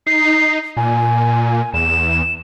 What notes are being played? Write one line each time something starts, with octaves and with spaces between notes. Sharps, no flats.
D#4 C7
A#2 G#5
E2 E7